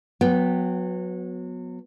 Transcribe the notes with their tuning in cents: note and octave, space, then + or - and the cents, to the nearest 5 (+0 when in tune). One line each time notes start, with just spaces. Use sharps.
F#3 -25 B3 +0 G5 +15